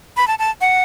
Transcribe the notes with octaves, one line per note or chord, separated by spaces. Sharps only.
B5
A5
A5
F#5